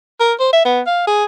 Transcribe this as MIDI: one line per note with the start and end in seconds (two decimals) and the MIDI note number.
0.20 0.33 70
0.40 0.52 72
0.53 0.62 76
0.65 0.81 59
0.87 1.04 77
1.07 1.25 68